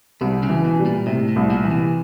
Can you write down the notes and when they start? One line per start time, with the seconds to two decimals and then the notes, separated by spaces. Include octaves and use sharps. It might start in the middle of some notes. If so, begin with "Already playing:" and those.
0.21 C2 C3
0.43 C#3
0.49 E3
0.64 B2
0.79 G3
0.86 A#2
1.07 A2 C3
1.29 A2
1.36 C2
1.50 A#2
1.64 E3
1.71 C3